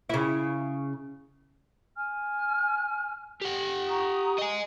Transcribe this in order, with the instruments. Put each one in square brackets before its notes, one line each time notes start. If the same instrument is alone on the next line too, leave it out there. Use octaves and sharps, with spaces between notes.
[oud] C#3 E4
[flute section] G#5 F6
[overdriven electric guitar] G4 F#5
[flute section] A#5 C#6 D#6
[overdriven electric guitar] D#5 G#5